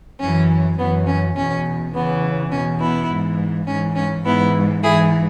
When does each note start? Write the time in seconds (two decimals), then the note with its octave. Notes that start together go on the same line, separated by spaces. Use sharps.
0.20 F#2 E3 C#4
0.78 F#2 E3 B3
1.07 C#4
1.36 E2 B2 C#4
1.93 E2 C#3 E3 B3
2.51 E2 B2 C#4
2.80 B3 E4
3.09 G#2 E3
3.67 G#2 E3 C#4
3.95 C#4
4.24 G#2 E3 B3 E4
4.82 E3 E4 G#4
4.87 G#2